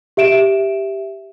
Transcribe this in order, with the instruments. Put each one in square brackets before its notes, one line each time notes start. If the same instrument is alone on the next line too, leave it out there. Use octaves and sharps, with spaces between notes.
[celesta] G4 E5 D7 E7